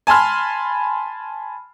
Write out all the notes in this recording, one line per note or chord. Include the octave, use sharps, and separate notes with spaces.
G#5 A5 B5 C6 F6